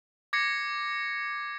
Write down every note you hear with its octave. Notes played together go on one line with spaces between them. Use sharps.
D6 G#6 A#6 C7 C#7